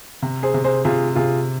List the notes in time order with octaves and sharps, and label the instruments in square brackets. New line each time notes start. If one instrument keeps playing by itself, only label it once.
[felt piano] C3
[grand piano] G#4 C5
[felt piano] C3
[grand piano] G#4 C5
[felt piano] C3 [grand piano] F4 G#4
[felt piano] C3 [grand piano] F4 G#4